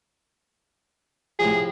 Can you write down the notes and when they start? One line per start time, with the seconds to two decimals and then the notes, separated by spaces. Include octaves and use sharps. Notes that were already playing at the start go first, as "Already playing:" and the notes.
1.39 A2 C3 F3 G#4